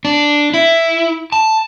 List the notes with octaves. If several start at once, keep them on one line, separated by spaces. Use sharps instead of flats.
D4
E4
A5